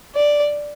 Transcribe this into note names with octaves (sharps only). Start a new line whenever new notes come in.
D5